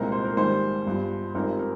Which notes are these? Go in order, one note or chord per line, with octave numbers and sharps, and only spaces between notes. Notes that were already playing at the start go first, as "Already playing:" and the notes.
Already playing: C2 A#2 F3 G#3 C4 A#4
C5
A#4
A#1 G#2 D#3 G3 C5
G1 G2 F3
G#1 G2 F3 C4 A#4
A#4